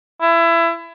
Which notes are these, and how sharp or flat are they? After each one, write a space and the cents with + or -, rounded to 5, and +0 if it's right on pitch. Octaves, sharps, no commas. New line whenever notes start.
E4 +25